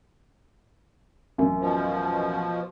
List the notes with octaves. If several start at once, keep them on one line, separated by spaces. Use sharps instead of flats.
A1 F#2
B2 F3